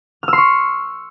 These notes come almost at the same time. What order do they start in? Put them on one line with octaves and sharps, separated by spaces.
F6 E6 C6 C#6